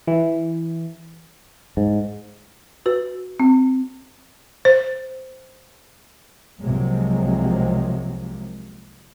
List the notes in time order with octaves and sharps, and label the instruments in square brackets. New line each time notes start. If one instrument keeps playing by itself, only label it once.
[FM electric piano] E3
[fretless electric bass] G#2
[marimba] F#4 B4
C4
[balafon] C5
[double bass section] C2 C3 F3 F#3 G#3 A#3